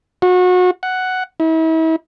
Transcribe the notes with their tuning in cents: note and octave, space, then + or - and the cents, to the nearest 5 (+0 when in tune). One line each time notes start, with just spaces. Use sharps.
F#4 -30
F#5 +5
E4 -40